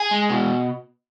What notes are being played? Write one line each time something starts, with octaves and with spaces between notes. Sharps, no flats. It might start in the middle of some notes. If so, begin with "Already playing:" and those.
Already playing: G#4
G#3
B2